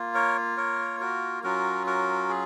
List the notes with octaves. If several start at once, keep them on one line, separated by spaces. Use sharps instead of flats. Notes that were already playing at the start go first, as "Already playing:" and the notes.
Already playing: A#3 F4
A#4 C#5
A#4 C#5
F#4 A#4
F#3 C#4 F4 F#4 A#4
F#4 A#4
G#4